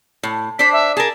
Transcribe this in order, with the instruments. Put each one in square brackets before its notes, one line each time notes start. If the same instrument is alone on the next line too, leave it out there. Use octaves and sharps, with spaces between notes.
[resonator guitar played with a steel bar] A2
[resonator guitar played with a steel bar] D4 C5 [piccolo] B6
[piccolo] E5
[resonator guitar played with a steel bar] G#4 A#4 [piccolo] A5